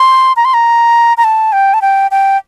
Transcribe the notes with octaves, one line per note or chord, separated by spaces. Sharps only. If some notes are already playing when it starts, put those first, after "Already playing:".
Already playing: C6
A#5
C6
A#5
A#5
A5
G5
A5
G5
G5